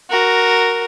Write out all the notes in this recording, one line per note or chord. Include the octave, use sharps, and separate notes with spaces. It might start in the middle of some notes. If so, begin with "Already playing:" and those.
F#4 A#4